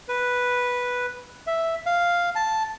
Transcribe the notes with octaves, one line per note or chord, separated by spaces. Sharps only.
B4
E5
F5
A5